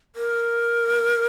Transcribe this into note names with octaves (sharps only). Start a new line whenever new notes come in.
A#4